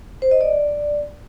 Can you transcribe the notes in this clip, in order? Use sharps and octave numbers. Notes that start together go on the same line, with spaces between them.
C5
D#5
D5